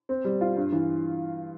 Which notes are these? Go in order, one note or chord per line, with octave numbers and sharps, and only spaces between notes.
C4
G3
F4
G2
E3